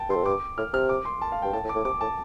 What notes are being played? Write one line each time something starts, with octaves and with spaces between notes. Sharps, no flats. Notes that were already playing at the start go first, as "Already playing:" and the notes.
Already playing: G5 A5
G2 C6
F2
G2 D6
A2 F6
C3 F6
D6
C6
A5
F5
G2 G5
A2 A5
A2
D6
A2
C3 D6
A2 A5